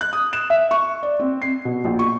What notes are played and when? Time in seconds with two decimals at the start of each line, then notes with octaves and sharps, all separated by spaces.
0.01 F#6
0.13 D#6
0.33 E7
0.50 E5
0.71 C#6
1.03 D5
1.19 C4
1.42 C7
1.65 B2
1.85 A#1
1.99 C#6